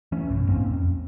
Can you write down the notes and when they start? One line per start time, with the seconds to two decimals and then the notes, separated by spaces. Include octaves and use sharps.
0.12 E3 A3 C#4
0.29 A#1 F#2 B2
0.49 G#2 A#3 C4 C#4
0.71 F2